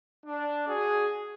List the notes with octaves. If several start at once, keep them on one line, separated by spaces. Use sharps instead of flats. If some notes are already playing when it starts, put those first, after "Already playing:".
D4
F#4 G#4